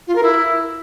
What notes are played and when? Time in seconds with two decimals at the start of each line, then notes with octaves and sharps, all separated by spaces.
0.07 F4
0.15 A#4
0.23 E4